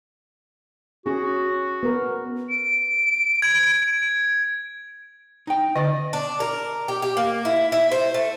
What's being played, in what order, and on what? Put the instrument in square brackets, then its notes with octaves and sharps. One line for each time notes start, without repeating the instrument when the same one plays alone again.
[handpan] C#4 G#4 [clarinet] F#4
[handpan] B3 A#4
[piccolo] D7
[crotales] G#6
[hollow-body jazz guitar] D#4 G5
[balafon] D3 [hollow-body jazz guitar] D5 D#5
[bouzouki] D4
A#4
G4
G4
A#3
E4
E4
C5
A3